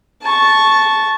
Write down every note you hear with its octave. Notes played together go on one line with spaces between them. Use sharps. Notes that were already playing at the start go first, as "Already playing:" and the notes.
A5 C#6